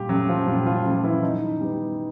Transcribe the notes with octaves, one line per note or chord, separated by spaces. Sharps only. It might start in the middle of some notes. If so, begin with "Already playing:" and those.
Already playing: A#2 G3 G4
F#3 A3 C#4 F#4
F3 F4
A#2 G3 G4
F3 F4
F3 F#3 A3 C#4 F4
E3 E4
D#3 D#4
G3 B3